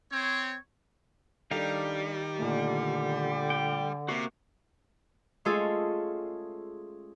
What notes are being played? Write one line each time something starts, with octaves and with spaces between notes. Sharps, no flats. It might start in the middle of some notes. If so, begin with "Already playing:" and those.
C4 C#5
D#3 G3 D4 D#4 A4 F5
A#2 D3 A3
G5
C3 A#3 F#4
G#3 A3 C#4 F4 G#4 A4